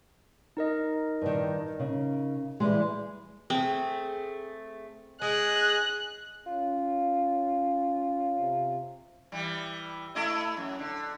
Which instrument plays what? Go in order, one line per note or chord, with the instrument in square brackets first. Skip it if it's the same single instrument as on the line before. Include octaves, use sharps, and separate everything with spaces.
[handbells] D#4 A#4 D#5
[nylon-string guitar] G2 D#3
C#3
E3 G3 G#3
[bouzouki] A3 G#4 [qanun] C4
[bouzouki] G#3 [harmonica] G#4 D#5 [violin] F#6
[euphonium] C#4 [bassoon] F4
[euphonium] C3
[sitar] E3 G3
A3 E4 D#5
F#2
D3